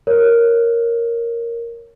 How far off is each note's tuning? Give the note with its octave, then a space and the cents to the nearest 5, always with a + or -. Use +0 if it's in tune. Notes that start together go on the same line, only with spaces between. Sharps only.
A#4 +0 C#5 +0